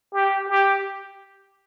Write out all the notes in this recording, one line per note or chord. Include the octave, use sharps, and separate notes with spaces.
G4
G4